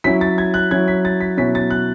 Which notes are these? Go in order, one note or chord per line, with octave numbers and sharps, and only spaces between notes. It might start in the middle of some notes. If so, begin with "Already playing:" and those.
F#3 C#4 E4 B6
A6
G#6
F#6
F#3 C#4 E4 G#6
B6
A6
B6
B2 F#3 C#4 E4 B6
A6
F#6